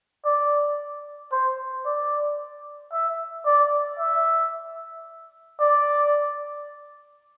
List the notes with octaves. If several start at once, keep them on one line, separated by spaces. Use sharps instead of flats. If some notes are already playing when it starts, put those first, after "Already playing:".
D5
C5
D5
E5
D5
E5
D5